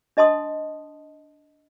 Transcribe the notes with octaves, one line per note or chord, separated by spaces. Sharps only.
D4 D#5 A5 C6 D#6